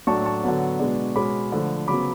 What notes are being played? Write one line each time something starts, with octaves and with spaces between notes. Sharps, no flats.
A2 F#3 A3 D4 A5 C#6
A5 C#6
D3 F#3 B3
B2 G#3 B3 D4
B2 G#3 C#4 B5 D6
D3 F3 A3
C#3 F#3 B3 B5 D6